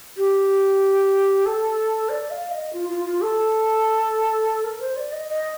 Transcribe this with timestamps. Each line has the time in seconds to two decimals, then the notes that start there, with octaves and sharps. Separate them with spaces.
0.17 G4
1.46 A4
2.09 D5
2.31 F5
2.52 D#5
2.73 F4
2.89 F4
3.05 F4
3.21 A4
4.64 A#4
4.80 C5
4.96 D5
5.13 D#5
5.29 D#5